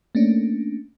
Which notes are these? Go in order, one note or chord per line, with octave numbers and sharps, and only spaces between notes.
A3 A#3 C#4 D4